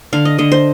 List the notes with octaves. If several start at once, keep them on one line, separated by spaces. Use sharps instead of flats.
D3 F5
D#5
D3 D#5
C5